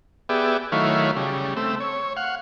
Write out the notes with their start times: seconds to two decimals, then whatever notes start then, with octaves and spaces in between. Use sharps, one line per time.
0.29 B3 G4 G#4 D5 E5
0.72 D#3 F#3 A3 E4 C#5 F5
1.16 C#3 G3
1.57 A3 C4 E6
1.80 C#5
2.17 F5 F#5